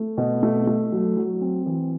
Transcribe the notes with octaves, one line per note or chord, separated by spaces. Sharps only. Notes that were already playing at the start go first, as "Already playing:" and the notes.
Already playing: A3
B2
A3
A3
F#3
F#3
C4
E3